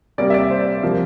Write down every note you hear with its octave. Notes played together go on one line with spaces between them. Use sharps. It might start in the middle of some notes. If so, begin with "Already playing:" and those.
C3 G3 A#3 D5
E5
D5
C5
C3 F3 A#3